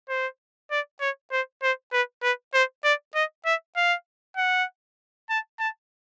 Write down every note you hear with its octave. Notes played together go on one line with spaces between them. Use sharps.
C5
D5
C#5
C5
C5
B4
B4
C5
D5
D#5
E5
F5
F#5
A5
A5